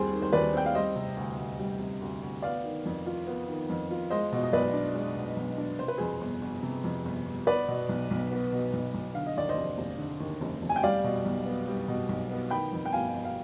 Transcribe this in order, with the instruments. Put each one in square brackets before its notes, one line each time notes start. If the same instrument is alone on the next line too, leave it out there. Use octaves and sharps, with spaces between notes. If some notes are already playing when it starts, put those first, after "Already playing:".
Already playing: [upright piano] D#2 G3 C4 G#4 C5
D#3
C5
D#2 B4 D5
C4 G5
F5
G3 C5 D#5
C3
D2
D2
G3
C3
D2
D2
B3 D5 F5
D#3
F2
F4
B3
D#3
F2
F4
G#3 C5 D#5
B2
D#5
B1 B4 D5
D4
G#3
B2
B1
D4
C3 C5
B4
F2 G#4 C5
G1
G1
C3
F2
G1
G1
B3 B4 D5
B2
B1
B1
B3
B2
B1
B1
D3 F5
D#5
D#2 D5
C5 D#5
F1
F1
D3
D#2
F1
F1
G#5
G5
G3 D5 F5
B2
B1
B3
G3
B2
B1
B3
D#3 G5 B5
F2
G5
G1 F5 G#5
G1
F5